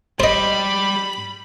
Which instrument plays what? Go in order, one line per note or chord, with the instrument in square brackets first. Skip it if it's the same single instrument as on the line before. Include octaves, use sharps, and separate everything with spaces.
[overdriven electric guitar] G3 [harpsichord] C5 D#5 [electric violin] B5